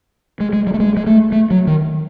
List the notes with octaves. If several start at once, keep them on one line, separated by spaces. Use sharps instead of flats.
G#3
G#3
G3
A3
G#3
G#3
A3
A3
F#3
D#3